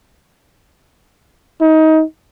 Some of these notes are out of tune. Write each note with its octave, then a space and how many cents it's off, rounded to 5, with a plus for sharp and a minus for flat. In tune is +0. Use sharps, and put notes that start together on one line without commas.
D#4 +25